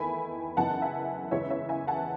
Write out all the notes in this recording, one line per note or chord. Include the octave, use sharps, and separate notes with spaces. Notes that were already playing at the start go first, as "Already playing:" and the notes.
Already playing: E2 D#3 A3 E4 G#5 B5
F#2 C#3 E3 B3 D#4 F#5 A5
E5 G#5
E2 C#3 E3 G#3 C#5 E5
C#5 E5
E5 G#5
F#5 A5